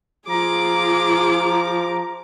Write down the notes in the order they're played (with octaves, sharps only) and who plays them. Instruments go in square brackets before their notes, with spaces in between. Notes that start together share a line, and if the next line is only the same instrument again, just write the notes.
[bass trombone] F3 [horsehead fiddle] F4 G#4 [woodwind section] A#5 [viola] D6